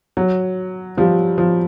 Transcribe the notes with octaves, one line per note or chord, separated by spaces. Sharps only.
F#3
F3 G3
F3